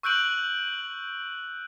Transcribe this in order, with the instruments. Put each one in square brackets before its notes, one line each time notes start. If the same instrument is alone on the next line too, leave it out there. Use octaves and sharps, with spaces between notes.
[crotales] C#6 E6 F#6 G6 D7 F#7